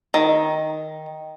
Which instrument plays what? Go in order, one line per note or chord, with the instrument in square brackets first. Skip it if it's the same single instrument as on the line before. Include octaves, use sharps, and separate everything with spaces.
[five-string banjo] D#3